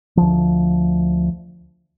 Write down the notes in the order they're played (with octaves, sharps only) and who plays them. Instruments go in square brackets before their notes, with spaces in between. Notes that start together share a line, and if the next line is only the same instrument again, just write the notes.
[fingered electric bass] D2 F3